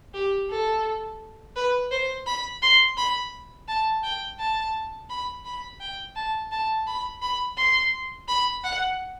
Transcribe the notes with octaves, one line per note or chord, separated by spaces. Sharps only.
G4
A4
B4
C5
B5
C6
B5
A5
G5
A5
B5
B5
G5
A5
A5
B5
B5
C6
B5
F#5